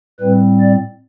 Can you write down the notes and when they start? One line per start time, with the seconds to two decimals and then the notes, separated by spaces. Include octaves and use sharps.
0.20 A2 G3 C4 B4
0.60 D5